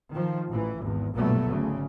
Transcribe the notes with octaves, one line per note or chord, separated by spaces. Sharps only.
D#3 F3
A1 E3
G#1 E2
A#1 G2 B2 F#3 A3 B3
G#1 D2 C#3